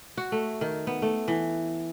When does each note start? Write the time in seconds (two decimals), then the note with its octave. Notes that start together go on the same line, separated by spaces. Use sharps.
0.17 F#4
0.32 A3
0.61 D#3
0.87 B3
1.02 A3
1.28 E3